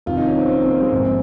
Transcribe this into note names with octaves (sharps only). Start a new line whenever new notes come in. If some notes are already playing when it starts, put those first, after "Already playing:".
F1 F2 D#3 F4
D#4
C#4
C4
C4
A#3
A#3
G#3
A#1 G#2 F3 C4